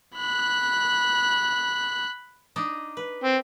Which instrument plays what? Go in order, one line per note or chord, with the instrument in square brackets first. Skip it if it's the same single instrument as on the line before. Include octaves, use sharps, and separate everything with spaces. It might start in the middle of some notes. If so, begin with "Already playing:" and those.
[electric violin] B5 F#6
[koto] D4 D#4 D#5
B4
[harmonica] C4